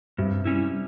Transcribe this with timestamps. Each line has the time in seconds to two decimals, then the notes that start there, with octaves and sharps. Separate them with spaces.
0.18 G2 C3
0.45 G3 C#4 E4